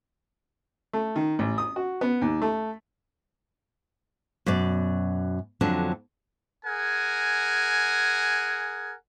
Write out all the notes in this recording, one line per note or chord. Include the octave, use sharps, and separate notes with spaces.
A3
D#3
A1
D#6
F#4
B3
D#2
A3
F#2 B2 D5
F2 D3 F#3 D4
G#4 A#4 F#5 G#5